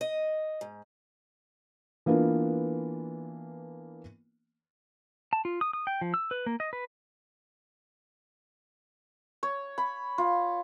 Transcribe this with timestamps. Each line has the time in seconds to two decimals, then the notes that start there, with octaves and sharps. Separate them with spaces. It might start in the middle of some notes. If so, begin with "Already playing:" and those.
0.01 D#5
0.61 G#2
2.06 E3 A#3 B3 D4 F4
5.33 A5
5.45 F4
5.61 D#6
5.73 D#6
5.87 G5
6.01 F3
6.14 E6
6.31 B4
6.46 A#3
6.60 D#5
6.73 B4
9.43 C#5
9.78 B5
10.18 F4